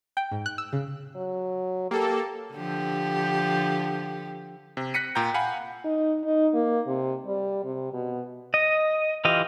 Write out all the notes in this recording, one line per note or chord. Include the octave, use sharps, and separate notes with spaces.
G5
G#2
F#6
E6
C#3
F#3
A#3 G4 A4
D3 F3 G4
C3
F#6 A#6 B6 C#7 D#7
A#2 G5 A#5 G6
F5 F#5 G#5 B5
D#4
D#4
A#3
C3
G3
C3
B2
D#5
E3 F4 G4 D#5 F5